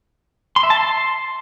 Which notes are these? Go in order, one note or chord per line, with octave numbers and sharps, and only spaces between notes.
C6
E5
A5
C6